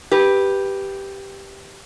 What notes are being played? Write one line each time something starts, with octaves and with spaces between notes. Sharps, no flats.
G4 B4